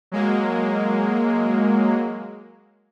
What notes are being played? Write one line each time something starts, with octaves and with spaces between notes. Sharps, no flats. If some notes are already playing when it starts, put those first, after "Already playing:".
F#3 G#3 A#3